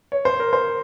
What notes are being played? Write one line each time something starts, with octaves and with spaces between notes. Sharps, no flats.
C#5
C5
A#4
C5